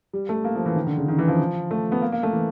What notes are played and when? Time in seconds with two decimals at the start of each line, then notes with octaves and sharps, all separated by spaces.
0.13 G3
0.29 A3
0.44 A#3
0.55 F3
0.66 E3
0.76 D#3
0.87 D3
0.98 C#3
1.08 D#3
1.18 E3
1.28 F3
1.71 A3
1.92 B3
2.02 A#3
2.12 A#3
2.23 A3
2.33 E3